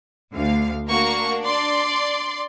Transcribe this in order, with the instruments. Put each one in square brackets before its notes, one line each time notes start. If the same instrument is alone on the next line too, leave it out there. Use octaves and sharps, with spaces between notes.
[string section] D2 F5
[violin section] A#3 F#4 C#6 [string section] D4
[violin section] D5 C6